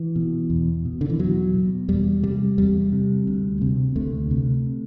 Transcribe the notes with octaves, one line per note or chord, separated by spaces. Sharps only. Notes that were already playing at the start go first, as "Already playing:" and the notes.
Already playing: E3
B2
E2
B2
D3
E3
E2 F#3
B2
E2 G3
C3 G3
E2 G3
C3
D2
C3
D2 A3
C3